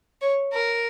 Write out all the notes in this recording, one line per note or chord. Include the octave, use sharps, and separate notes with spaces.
C#5
A#4